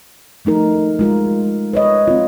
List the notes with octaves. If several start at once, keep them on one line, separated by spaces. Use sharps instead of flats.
F3 A3 D#4 A#4
G#3 F4 A#4
B4 C#5 D#5
C4 F4